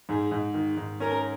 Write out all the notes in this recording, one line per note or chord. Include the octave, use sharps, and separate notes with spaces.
G#2 G#4
G#2
D#3
G#2
C#4 A#4